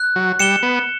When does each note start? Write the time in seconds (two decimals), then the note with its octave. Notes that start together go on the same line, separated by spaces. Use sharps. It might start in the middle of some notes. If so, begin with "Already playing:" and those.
Already playing: F#6
0.16 F#3
0.39 G3 C#7 E7 G7
0.63 B3